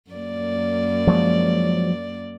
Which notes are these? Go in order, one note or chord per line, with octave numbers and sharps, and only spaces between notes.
F#2 A#3 D5
F3 F#3 G#3